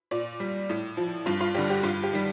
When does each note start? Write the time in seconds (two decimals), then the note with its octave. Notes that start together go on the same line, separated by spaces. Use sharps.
0.11 A#2 D5
0.40 G3
0.70 A2
0.97 F3
1.26 G2 F4
1.41 F4
1.54 D3 G3 G4
1.70 G4
1.83 G2 F4
2.03 G4
2.13 D#3 G3